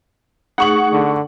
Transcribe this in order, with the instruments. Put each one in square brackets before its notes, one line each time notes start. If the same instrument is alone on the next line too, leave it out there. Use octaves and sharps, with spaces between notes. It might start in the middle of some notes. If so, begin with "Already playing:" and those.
[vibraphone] A3 D#4 G#4 [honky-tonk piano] F#5 C#6 F#7
[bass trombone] D3